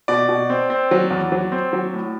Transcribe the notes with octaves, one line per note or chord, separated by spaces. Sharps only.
B2 D5
B2
C4
C4
F#3
E2
F#3
C4
F#3
A2